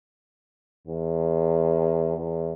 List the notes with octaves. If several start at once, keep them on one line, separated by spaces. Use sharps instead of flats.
E2
E2